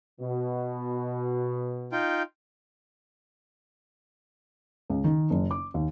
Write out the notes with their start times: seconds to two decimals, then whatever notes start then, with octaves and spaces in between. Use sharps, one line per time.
0.21 B2
1.92 D#4 F4 G5
4.90 C#2
5.04 D#3
5.30 F#1
5.51 D6
5.74 D#2